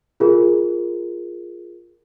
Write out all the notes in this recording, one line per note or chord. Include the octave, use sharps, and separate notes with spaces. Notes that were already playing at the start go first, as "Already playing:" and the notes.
F4 G#4 A#4